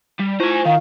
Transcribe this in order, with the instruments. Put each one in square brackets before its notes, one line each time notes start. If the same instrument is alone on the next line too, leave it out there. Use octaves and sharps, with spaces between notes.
[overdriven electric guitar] G3
[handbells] E4 F4 C#6 [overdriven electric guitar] C5 G#5
[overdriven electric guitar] D#3 [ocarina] F5